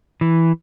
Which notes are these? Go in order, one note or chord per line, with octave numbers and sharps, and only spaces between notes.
E3